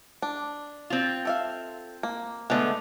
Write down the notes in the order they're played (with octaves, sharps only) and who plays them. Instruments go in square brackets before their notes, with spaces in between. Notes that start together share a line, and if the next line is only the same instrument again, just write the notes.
[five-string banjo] D4
[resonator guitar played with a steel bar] C4 F4
[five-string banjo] A4 E5 F5
A#3
[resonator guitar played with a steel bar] D3 B3 [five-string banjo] G#3 A3